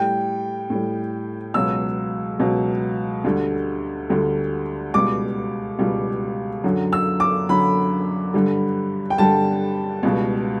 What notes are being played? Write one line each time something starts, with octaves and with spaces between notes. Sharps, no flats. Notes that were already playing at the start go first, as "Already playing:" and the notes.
Already playing: A2 G3 G5
A2 G3
C#2 B2 F#3 E6
C#2 B2 F#3
D2 D3 G3
D2 D3 G3
C#2 B2 G3 D6
C#2 B2 G3
F#2 D3 F#3
E6
D6
F#2 D3 F#3 B5
G2 D3 G3
G5
G2 D3 G3 A5
C#2 B2 G3